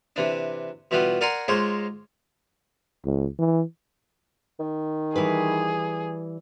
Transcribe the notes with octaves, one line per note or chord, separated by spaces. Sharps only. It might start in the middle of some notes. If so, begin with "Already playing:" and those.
C3 E3 D4
B2 E3 G3 B3 F4
A#4 D5 F#5 G#5 A#5 C6
G#2 G#3 F4 C5 C#5 D6
C#2
E3
D#3
E3 G3 G#4 B4